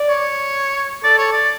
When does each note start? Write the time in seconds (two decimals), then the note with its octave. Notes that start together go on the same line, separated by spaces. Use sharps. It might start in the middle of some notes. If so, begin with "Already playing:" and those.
Already playing: D5
0.09 C#5
1.04 A4 D5
1.18 C#5
1.32 D5